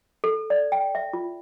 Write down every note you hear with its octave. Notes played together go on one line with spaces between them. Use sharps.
A4
D5
G5
E5
F4